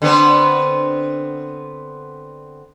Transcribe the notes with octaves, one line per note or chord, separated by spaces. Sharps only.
D3 B3 C4